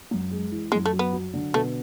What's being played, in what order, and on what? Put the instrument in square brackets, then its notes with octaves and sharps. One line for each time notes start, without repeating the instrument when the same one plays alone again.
[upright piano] F#2
G#3
E3
[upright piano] F#2 [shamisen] G#3
[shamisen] A3
[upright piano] F#3
[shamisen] B3
[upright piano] F#3
D3
[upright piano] B2 [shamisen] A3